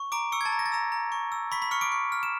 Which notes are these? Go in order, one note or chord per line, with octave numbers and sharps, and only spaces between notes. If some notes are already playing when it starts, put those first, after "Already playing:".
Already playing: C#6
A#5 D6 D7
C#6 E6 C#7
G#6
A5 A6
A#5
A#6
A6
A#5 E6 A#6
A#5
C#6
E6
B5 C#6 B6
B5 B6
C#6 F6 C#7
D6 D7
C#6
F6
E7